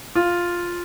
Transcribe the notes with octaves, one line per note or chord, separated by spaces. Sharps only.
F4